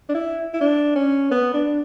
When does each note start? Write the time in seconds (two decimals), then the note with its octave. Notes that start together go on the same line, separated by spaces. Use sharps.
0.09 D4
0.15 E4
0.54 E4
0.61 D4
0.96 C#4
1.31 B3
1.54 D4